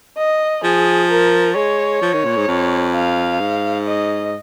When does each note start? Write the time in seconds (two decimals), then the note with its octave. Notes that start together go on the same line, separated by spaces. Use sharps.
0.17 D#5
0.64 F3 G#4
1.10 A#4
1.55 G#3 C#5
2.02 F3
2.13 D#3
2.25 A#2
2.36 G#2
2.48 F2
2.94 F5
3.40 G#2
3.87 D#5